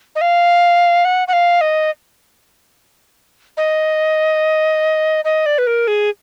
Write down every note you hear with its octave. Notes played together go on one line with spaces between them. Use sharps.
D#5
F5
F#5
F#5
F5
D#5
D#5
D#5
D5
B4
A#4
G#4